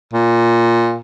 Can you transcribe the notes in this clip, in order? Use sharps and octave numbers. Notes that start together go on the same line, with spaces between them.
A#2